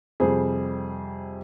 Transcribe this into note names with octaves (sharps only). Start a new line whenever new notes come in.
F2 C3 G3 G#4 C5